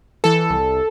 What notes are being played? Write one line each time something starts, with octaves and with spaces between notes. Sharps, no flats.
E3 A4
C2